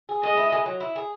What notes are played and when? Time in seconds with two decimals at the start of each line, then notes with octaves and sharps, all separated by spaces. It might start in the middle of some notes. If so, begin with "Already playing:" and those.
0.09 G#4
0.23 G#3 D#5
0.37 E4
0.52 G#3
0.66 F#3
0.80 E4
0.96 G#4